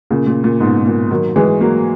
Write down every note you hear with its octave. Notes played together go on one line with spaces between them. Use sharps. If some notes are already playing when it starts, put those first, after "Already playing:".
A#2 C#3
A#2
A#2
G#2 B2
A#2
D#3 F#3
E3 G#3
F#3 A#3